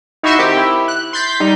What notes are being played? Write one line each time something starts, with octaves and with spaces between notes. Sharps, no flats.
D#4 E4 F#4 E5 C6 C#6
D#3 C4 G4
E4
F#6
C6 G6 A6 B6
G3 D#4